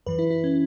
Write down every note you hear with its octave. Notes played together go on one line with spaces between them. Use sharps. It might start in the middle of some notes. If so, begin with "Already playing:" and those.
F#2 E3 B4
E4
E4
C#4